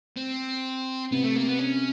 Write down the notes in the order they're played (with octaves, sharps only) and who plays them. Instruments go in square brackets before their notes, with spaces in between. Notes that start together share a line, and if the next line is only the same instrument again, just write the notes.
[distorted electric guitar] C4
[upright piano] C3 [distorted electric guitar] B3
[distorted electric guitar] A3
A#3
B3
C#4